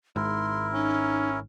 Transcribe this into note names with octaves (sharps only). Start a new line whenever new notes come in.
G#1 G#2 E4 A#4 C6
C#4 D#4